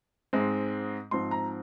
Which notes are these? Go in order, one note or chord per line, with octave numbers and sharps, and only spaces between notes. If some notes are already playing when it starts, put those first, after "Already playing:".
G#2 G#3 C4
G#2 F3 C4 C6
A#5